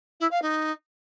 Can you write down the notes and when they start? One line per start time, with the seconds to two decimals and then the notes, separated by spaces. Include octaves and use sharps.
0.20 E4
0.31 F5
0.42 D#4